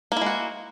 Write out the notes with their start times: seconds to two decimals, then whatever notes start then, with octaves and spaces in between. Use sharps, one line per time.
0.12 A#3
0.17 E4
0.21 G#3
0.26 F#4